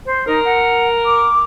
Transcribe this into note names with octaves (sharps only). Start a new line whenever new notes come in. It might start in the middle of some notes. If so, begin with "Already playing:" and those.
C5
D#4 A#4
F#5
D6